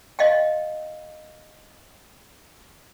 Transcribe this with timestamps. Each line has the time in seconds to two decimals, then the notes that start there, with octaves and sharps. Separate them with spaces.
0.19 D#5 F5 G5